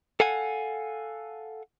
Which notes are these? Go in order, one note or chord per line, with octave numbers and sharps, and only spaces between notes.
A4 F5 F#5 G#5